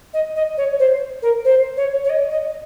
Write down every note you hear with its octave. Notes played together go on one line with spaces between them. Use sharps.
D#5
D#5
C#5
C5
A#4
C5
C#5
C#5
D#5
D#5